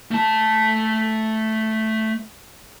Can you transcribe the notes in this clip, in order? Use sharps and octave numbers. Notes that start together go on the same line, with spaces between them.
A3 A5